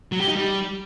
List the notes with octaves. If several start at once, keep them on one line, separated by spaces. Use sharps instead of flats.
F#3
G4
D#4
G3